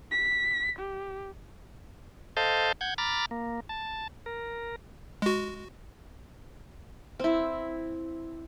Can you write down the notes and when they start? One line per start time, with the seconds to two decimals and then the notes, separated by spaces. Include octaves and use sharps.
0.11 B6
0.79 G4
2.37 A4 C5 D#5 F5 A5 G6
2.81 F#5 G6 G#6
2.98 A#5 B5 D6 F6 A6
3.31 A#3
3.69 A5
4.26 A#4
5.22 G#3 F#4
7.20 C4 E4